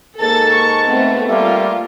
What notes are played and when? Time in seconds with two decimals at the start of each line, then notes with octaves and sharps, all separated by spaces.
0.20 G#2 G#3 A#3 A4 A5 A6
0.51 C#6
0.86 A3 B3 C4
1.29 G3 A3 A#3 F4